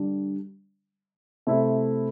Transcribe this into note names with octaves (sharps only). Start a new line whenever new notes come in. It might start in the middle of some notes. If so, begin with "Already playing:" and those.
Already playing: D3 G3 D4
C3 A3 E4 A4 E5